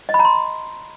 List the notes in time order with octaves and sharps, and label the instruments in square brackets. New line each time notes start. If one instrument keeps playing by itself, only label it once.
[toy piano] D#5
B5
A#5
C6